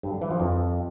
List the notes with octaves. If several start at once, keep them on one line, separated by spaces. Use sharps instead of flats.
G2
D3
E3
F3
F2